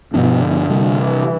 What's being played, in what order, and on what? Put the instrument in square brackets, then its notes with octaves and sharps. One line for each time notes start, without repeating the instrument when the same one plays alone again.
[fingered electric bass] G2 F3 B3 D4 [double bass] B2
[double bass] D3
[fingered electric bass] C3 G3 D4
[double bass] E3